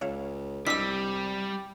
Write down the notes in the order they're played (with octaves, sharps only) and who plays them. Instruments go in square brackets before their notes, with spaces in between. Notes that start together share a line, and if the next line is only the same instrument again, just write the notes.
[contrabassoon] C#2 [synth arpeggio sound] C#5 E5 F5
[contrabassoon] C2 [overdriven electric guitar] G3 [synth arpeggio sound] D4 E4 D#5 [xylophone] E6 B6